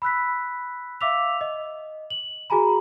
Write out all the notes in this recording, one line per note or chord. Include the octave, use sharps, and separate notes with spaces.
B5 E6 F#6 B6
E5 F5 D6 E6 B6 F7
D#5
F#7
F#4 G#4 G#5 A#5 B5